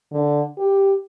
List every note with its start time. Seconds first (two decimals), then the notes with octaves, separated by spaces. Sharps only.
0.12 D3
0.58 G4